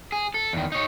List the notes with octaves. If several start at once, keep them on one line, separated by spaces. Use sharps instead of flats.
G#4
A4
E2 D#3
D#4 C#5